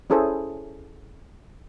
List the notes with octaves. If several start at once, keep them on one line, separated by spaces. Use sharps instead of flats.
C#4 E4 G#4 A4 C5